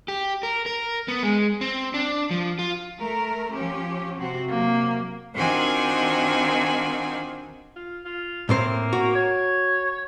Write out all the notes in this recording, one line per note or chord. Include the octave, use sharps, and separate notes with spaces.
G4
A#4
A#4
B3
G#3
C4
D4
F3
F4
A3 A#4
F3 C#4 G4
C3 C4 F#4
C3 F#3 A#3
D#3 C4 D4 F4 F#4 G#5
F4
F4
A2 A#3 C4 C5
F#4
C#5